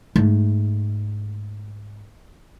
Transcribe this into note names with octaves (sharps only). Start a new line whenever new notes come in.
G#2 A3